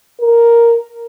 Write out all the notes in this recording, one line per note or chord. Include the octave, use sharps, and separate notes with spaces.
A#4